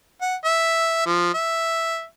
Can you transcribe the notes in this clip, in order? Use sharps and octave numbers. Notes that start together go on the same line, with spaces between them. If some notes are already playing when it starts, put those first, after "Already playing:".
F#5
E5
F3
E5